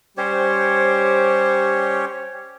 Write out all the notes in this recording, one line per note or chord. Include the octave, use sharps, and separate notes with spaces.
G3 C#4 G4 C5 C#5